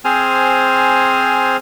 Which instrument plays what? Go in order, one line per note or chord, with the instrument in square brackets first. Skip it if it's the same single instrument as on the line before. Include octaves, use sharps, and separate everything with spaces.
[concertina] C4 G#4 C5 G#5 F6